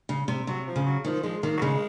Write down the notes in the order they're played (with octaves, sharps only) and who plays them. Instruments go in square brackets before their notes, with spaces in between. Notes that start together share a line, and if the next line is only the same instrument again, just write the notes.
[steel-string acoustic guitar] C#3
C3
[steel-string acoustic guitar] C3 [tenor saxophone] F#3
[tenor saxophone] F3
[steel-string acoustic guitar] C#3
[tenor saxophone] F#3
[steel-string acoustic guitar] D#3 [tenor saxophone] F3
[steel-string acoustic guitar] F3 [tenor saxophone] G#3
[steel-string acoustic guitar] D#3 [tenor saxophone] A#3
[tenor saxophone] F#3
[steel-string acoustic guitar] C#3 [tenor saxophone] G#3